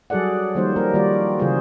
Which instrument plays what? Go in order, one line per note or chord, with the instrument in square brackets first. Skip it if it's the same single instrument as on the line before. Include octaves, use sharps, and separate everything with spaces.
[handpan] F#3 G3 G#4 A4 D5 F#5
D#3 F3 G3 A#3 D#4 C5
A#3 G4 A#4
D#3 G3 A#3 F4 F#4 D5
C#3 E3 F#3 F4 G#4 C5